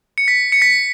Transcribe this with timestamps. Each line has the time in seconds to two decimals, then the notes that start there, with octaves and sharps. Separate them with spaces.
0.18 C#7
0.28 B6
0.52 C#7
0.62 B6